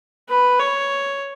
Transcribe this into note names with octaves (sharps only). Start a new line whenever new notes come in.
B4
C#5